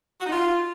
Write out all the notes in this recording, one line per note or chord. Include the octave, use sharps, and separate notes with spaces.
F#4
D#4
F4